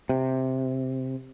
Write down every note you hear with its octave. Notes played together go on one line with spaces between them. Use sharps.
C3